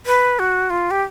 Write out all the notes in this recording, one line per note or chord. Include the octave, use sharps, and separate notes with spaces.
B4
F#4
F4
G4